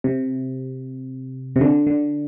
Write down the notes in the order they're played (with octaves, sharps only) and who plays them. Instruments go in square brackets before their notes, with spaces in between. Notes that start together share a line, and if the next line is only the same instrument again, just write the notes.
[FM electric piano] C3
C3
D3
D3